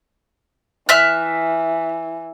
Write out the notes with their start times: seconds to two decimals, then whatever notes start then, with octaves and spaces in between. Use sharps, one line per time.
0.89 E3 E5 F6 F#6